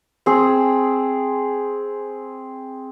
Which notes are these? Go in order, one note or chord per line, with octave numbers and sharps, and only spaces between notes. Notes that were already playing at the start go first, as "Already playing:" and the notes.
C4 G#4